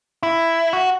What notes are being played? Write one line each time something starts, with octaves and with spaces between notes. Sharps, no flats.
E4
F#4